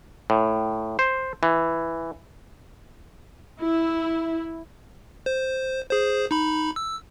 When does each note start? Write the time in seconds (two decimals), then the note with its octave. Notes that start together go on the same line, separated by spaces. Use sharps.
0.30 A2
0.99 C5
1.43 E3
3.61 E4
5.26 C5
5.91 G#4 C5
6.31 D#4 B5
6.76 E6